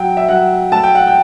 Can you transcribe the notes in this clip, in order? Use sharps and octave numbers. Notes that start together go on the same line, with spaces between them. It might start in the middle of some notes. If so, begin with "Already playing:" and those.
Already playing: F#3 G5
E5
F#3 F#5
A3 A5
G5
F#5
G5